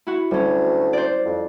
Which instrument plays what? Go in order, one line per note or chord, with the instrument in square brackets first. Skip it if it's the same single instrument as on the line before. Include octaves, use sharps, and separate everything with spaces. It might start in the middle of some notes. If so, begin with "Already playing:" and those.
[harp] E4 F#4
[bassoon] D2 [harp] G3 C#4
[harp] C5 D5
[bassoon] F2